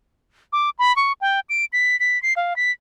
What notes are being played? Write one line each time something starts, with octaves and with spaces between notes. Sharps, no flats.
D6
B5
C#6
G5
D7
B6
B6
C7
F5
B6